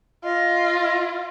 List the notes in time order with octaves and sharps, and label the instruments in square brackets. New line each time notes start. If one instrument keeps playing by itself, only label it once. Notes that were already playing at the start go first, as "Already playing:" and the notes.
[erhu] F4 [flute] D#5